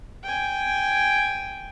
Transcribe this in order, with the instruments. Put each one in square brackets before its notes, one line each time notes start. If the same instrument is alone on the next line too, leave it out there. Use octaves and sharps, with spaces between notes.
[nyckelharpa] G5 G#5